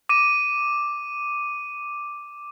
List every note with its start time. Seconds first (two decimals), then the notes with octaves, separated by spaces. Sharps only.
0.09 D6 D#7